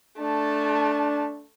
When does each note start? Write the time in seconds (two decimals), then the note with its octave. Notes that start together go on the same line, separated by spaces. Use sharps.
0.19 A3 D4 A5